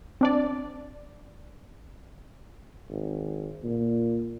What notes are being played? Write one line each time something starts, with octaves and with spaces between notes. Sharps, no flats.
C4 D4 D5
G#1
A#2